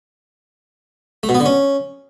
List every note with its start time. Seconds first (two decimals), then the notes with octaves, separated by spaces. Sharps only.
1.23 A3
1.29 B2
1.35 B3
1.40 D3
1.46 C#4